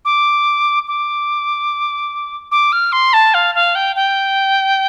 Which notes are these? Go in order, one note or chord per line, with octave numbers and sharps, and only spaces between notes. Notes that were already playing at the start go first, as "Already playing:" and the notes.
D6
D6
D6
F6
C6
A5
F5
F5
G5
G5